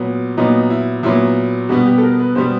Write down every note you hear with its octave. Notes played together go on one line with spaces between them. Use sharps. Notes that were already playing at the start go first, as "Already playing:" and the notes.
Already playing: A#2 F#3 B3
A#2 F#3 B3 D#4
E4
A#2 F#3 B3 E4
B2 G3 B3 F#4
G4
A4
A#4
B4
B2 G3 B3 C5